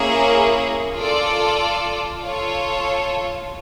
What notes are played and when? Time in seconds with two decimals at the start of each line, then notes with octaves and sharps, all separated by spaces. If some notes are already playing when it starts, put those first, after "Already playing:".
Already playing: A#3 C#4 E4 G#4 C#5
0.95 F4 A4 D5
2.22 F4 A4 C#5